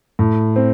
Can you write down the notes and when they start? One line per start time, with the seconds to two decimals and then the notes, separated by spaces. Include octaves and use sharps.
0.19 A2
0.56 C4